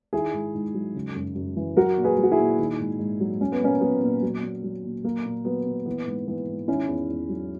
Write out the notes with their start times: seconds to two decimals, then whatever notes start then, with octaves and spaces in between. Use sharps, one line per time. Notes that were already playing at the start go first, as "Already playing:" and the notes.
0.13 D#3 E4 G#4
0.33 G#2
0.55 G#2
0.74 F#3
0.95 C#3
1.15 F#2
1.35 F#2
1.57 E3
1.76 F#3 F#4 A#4
1.98 A#2
2.04 G#4 B4
2.18 F#3
2.23 F#4
2.32 E4 G#4
2.39 A#2
2.59 D#3
2.80 G#2
2.99 G#2
3.20 F#3
3.41 F#3 C#4
3.52 B3
3.62 A#2 A#3 C#4
3.81 F#3 B3
4.02 A#2
4.22 F#3
4.43 A#2
4.64 F#3
4.85 A#2
5.04 F#3 A#3
5.26 A#2
5.45 F#3 B3
5.66 A#2
5.86 E3 B3
6.07 G#2
6.28 E3 B3
6.48 G#2
6.68 D#3 C#4 E4
6.88 E2
7.09 E2
7.29 F#3